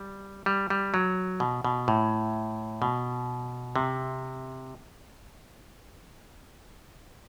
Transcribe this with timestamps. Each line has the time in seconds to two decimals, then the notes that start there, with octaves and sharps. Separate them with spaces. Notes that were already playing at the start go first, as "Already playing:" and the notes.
Already playing: G3
0.46 G3
0.70 G3
0.94 F#3
1.40 B2
1.65 B2
1.88 A2
2.82 B2
3.76 C3